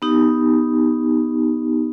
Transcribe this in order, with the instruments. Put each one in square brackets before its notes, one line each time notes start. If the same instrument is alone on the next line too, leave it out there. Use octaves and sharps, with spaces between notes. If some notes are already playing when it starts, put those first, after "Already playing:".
[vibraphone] B3 D#4 G4